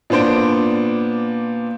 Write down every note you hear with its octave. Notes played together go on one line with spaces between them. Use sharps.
A#2 B3 D4 C5 D7